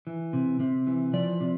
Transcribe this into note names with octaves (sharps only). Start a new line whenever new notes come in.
E3
C3
C3
E3
F3 D5
C3